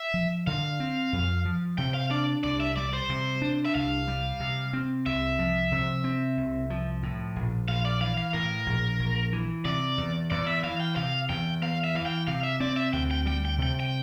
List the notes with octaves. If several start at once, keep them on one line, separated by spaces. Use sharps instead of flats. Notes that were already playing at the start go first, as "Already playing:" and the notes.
Already playing: E5
F3
D3 F5
C4
F2
F3
C3 G5
F5
D4 D5
C2 D5
E5
G3 D5
C5
C3
D4
E5
C2 F5
G3
C3
C4
C2 E5
F3
C3
C4
C2
F3
A2
A#1
A#1 F5
D5
E3 F5
F5
A2 A#4
A#1
A#1
E3
C3 D5
E2
E2 D5
E5
E3 F5
G5
C3 F5
E2 G5
E2 F5
E5
E3 F5
G5
C3 F5
E5
C4 D5
E5
D2 G5
G5
G3 G5
G5
C3 G5
G5